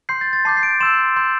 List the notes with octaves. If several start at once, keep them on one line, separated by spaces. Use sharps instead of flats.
C6 G6 C7
A6
A6
A5 D6 G6 C7
C7
D7
C6 E6 G6 E7
C6 G6